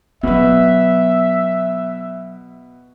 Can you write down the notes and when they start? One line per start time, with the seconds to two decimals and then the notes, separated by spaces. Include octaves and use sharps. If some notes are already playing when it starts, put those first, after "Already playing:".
0.23 B2 F#3 B3 B4 E5